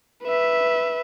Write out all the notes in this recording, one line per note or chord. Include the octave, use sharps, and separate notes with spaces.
B4 E5